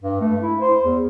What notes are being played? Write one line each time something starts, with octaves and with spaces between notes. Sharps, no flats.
G2
A3
E4
C5
E2